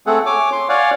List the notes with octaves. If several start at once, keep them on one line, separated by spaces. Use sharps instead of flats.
A3 C4 G#4 A4 F#5
C#5 G#5 D6
C6
C#5 D5 F5 F#5 G#5